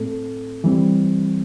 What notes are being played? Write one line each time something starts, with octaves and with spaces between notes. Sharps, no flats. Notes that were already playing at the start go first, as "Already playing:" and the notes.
Already playing: A2 A3 C4 A4
E3 G3 C4